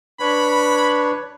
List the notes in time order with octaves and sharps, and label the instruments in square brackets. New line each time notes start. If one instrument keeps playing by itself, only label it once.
[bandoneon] D4 B4 C#5 [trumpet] B5